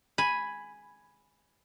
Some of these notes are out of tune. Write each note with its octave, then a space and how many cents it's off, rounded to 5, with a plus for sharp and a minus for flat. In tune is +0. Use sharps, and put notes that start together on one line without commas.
G#5 +0 B5 +0